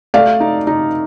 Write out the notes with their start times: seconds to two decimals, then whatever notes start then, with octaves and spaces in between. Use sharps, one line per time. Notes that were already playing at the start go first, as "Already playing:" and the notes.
0.14 A3 D5 F5
0.40 D#4
0.67 D#4